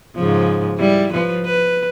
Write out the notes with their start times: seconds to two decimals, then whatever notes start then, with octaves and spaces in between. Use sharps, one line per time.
0.16 G#2 C#3 F3
0.78 G3 E4
1.13 F3 B4
1.45 B4